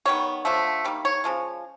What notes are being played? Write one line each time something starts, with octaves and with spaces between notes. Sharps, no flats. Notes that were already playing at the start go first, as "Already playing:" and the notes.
D#3 G3 B3 C#5
D3 F3 A3
D#3 G3 A#3
C#5
C#3 F3 G#3